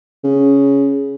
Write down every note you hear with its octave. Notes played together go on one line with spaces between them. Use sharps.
C#3